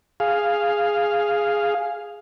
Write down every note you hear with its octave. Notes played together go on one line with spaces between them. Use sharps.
G#4 F5